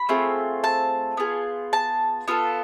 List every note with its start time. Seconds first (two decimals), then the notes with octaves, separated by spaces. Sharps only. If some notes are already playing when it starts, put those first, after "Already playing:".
Already playing: B5
0.09 A3 C4 F4 G#4
0.64 A5
1.17 B3 F4 G#4
1.73 A5
2.28 B3 F4 A4